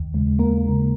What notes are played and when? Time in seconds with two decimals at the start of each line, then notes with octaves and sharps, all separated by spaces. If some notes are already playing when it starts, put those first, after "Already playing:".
Already playing: D#2
0.14 C#3 G#3
0.39 D#2 A#3 A#4
0.65 C#3 G#3